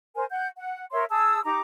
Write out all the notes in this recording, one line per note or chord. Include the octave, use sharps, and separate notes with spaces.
A#4 C5 G#5
F#5 G6
F#5
A#4 C#5 E5 C6
G#4 A5 D#6 E6
D#4 G4 A#5 D6